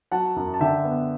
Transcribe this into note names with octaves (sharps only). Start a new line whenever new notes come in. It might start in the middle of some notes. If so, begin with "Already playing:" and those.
F#3 F#5 A5
F#2
A5
D3 E5 G5
B3